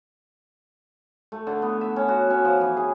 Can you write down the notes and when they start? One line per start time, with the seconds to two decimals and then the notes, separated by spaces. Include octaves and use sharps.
1.32 A3
1.47 D3
1.62 B3
1.81 E5
1.96 C#4
2.08 F#4
2.30 C#4
2.45 F3
2.61 E3
2.77 G#4